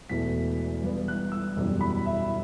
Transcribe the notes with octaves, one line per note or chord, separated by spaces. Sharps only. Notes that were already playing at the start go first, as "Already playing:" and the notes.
E1 E2 B2 A3 B6
G2 E3 B3
F#6
E6
F#1 E2 B2 G3
B5
E5